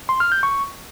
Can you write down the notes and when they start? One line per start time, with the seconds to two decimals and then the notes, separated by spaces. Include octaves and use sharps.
0.09 C6
0.20 F6
0.32 G6
0.43 C#6